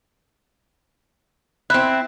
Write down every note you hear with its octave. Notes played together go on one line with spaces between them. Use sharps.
C4 E4 F#6